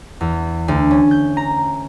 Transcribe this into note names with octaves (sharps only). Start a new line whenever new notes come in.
E2
D2
C#4
G6
A#5